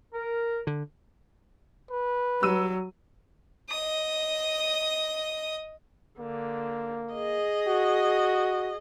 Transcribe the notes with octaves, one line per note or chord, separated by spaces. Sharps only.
A#4
D3
B4
F#3 G3 E6 D#7
D#5 D#6
D3 A#3
G#4 D#5
F#4